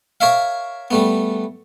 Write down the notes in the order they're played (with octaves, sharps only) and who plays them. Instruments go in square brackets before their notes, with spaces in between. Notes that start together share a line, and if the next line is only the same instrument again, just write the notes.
[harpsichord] A#4 C#5 E5 F5
G3 A3 B3